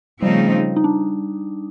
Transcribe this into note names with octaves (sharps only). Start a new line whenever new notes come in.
C#3 F3 G3 A3 C4 D#4
D#4
D4